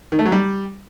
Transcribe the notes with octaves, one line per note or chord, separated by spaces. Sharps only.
D#3
A3
F#3
G3